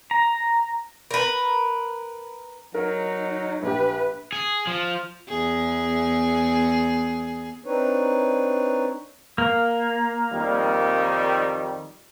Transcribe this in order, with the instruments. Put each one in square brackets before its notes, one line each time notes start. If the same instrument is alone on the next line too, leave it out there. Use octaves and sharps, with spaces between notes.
[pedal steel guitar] A#5
[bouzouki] A#4 B4
[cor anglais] F#3 [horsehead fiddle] D#4 [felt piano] A#4
[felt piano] A#1 G4 [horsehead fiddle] B4
[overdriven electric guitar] G#4
F3
[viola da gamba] E2 G#4
[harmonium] C4 D4 D#4 B4 C#5
[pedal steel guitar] A#3
[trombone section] F2 D#3 G3